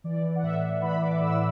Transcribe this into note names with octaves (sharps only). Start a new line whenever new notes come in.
E3 D5
E3
F#5
A2 E5
E3
E3 B5
E3 D6
A2 E6